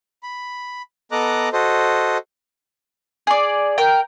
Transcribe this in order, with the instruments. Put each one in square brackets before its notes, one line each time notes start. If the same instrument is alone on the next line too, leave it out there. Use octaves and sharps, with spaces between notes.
[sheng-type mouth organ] B5
B3 A4 D#5 A#5 D6 F#6
F#4 A4 C5 D#5
[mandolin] G#4 D5
A#4 G5